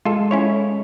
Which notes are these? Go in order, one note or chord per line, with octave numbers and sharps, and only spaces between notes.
G#3 F4 A4
C#4 E4 C#5